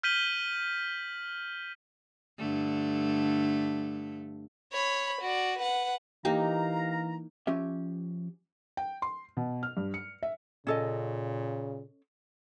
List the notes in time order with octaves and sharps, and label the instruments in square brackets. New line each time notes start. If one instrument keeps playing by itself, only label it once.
[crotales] F6 G6 B6 D#7 F#7 G7
[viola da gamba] G2 D3 A3
[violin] C#5 B5
F#4 D5
B4 F#5
[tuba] E3 [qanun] A#3 D#4 [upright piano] G4 [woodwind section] F5 A#5
[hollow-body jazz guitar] F3 C#4 G4 E5
[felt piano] G5
C6
B2
F6
G2
C#7
E5
[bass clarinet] A#2 [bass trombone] C#3 [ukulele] C#4 A4 D#5